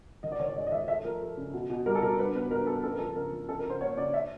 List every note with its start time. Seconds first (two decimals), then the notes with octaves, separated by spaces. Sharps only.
0.23 D#3 D#5
0.32 D5
0.40 D#3 C#5
0.48 D5
0.56 G#3 D#5
0.67 D#5
0.72 D#3 E5
0.88 A3 E5
1.04 F3 A#4
1.21 A3
1.37 C#3
1.54 B2
1.70 B2
1.86 G3 A#4
1.95 A4
2.02 B2 A#4
2.18 G2 B4
2.35 B3 B4
2.50 G2 A#4
2.67 B3 A4
2.83 C#3 A4
2.91 A#4
2.99 F3 A4
3.16 C#3 A#4
3.32 F3
3.48 C#3 A4
3.59 A#4
3.65 C#3
3.70 C5
3.81 A#3 C#5
3.97 C#3 D5
4.14 E5